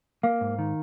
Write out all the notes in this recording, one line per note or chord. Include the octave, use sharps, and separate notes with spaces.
A#3 F5
G#2
D#3